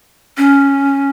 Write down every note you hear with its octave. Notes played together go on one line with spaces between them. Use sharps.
C#4